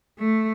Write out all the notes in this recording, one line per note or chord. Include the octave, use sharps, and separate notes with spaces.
A3